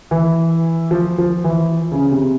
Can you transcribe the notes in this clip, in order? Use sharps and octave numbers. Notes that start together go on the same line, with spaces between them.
E3
F3
F3
E3
C#3
C3